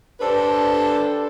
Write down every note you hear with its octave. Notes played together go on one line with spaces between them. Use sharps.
D4 G4 A4 B4 C5